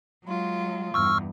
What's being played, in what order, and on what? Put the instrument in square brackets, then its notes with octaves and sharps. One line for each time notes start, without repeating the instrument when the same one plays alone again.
[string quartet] F#3 G#3 F4
[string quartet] E2 G2 [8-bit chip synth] C#6 E6 F6